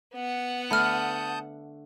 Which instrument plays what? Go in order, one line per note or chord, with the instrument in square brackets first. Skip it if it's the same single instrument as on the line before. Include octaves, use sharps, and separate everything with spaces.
[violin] B3 F#5
[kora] D3 A3 [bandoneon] A5 D#6 G6 [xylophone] B5 F6